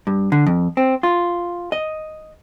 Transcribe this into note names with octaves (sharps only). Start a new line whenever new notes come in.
G2
D3
F2
C4
F4
D#5